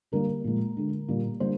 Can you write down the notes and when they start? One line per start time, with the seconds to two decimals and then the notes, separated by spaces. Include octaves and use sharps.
0.12 D3 G3 A#3 A#4
0.44 A#2 F3 G#3
0.77 D3 G#3
1.08 A#2 G3 A#3
1.40 D3 G3 A#3 C5